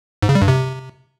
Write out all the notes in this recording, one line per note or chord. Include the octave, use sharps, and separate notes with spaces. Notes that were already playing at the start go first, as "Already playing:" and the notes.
G#2
C#3
G3
G2
C3